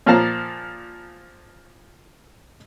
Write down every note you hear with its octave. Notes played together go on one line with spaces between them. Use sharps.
A#2 F3 A#3 F5 A5 A#5